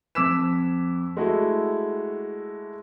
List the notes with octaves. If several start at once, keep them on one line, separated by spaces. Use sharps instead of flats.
F2 D6 E6 B6 E7
G#3 A3 E4 F#4